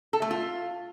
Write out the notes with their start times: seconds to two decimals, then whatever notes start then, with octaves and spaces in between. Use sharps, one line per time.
0.13 A4
0.22 A3
0.31 F4